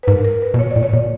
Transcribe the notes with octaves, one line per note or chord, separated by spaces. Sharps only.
B4
G#2 A#4
A#4
B4
B2
C#5
D5
A#2
C#5
B2